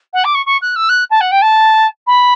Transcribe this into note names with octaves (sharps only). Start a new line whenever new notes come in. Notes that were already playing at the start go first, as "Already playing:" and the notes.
F#5
D6
C#6
C#6
F#6
E6
F#6
A5
F#5
G5
A5
B5